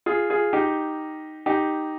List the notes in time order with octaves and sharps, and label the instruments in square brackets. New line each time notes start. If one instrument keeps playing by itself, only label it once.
[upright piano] F4 G#4
F4 G#4
D#4 G4
D#4 G4